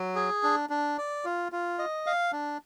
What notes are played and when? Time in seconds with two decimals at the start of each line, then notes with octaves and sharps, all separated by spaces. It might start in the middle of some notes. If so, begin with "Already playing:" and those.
Already playing: F#3
0.15 G#4
0.43 D4
0.70 D4
0.98 D5
1.25 F4
1.52 F4
1.79 D#5
2.06 F5
2.32 D4